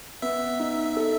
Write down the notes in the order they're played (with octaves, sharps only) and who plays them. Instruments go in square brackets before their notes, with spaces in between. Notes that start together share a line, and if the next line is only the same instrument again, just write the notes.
[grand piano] B3 [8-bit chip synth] E5
[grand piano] D#4
A4